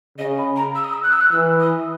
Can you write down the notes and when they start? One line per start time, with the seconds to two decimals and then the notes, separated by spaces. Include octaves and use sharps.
0.18 C#3 D#5
0.37 B5
0.55 A#5
0.75 E6
0.84 D#6
0.93 E6
1.03 F#6
1.12 E6
1.20 F#6
1.31 E3 E6
1.59 D#6